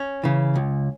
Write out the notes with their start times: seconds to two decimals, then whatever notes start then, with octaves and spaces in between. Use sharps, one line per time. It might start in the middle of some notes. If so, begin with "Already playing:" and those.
Already playing: C#4
0.24 C#3 E3
0.55 C#2